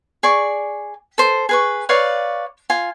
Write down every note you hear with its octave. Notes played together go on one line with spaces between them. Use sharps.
G#4 D5 C#6
A4 C5
G#4 B4 C#6
B4 C#5 D5 F5
F4 G#5